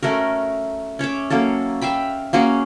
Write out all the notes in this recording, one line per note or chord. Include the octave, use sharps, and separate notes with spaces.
A3 C#4 F#4 A#4
C#4 C#5 E5 D6
F#3 A#3 C#4 A4
E5 F5 G5 B5
A#3 C#4 F#4 G#4